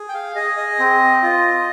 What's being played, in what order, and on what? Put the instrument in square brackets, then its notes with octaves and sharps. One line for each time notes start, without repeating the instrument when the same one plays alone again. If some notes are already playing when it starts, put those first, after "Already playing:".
Already playing: [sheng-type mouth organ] G#4
G5
F5
G#4 D#5
D#5
C4
F4